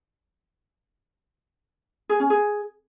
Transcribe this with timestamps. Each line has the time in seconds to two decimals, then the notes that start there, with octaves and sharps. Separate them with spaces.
2.09 G#4
2.20 C#4
2.30 G#4